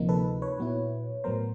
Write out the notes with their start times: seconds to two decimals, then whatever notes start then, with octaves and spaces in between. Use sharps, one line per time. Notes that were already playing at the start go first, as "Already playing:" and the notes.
Already playing: D2 C3 F3 A#3 D#4
0.09 A4 B4
0.42 B4 C#5
0.58 A#2 F#3 B3 E4
1.24 A2 F#3 B3 A#4 C5